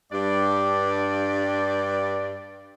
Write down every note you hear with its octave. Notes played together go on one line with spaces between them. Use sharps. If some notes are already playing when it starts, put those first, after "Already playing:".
G2 D5